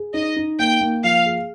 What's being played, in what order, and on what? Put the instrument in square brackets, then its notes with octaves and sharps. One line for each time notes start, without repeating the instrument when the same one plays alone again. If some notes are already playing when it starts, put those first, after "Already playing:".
Already playing: [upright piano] G#4
[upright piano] D#4 [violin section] D#5
[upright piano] D#4
[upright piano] A#3 [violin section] G5
[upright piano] A#3
[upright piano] F3 [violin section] F5
[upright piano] G#4